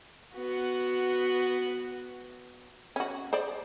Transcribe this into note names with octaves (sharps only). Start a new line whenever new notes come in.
B3 F#4
C#4 F#4
C5 D5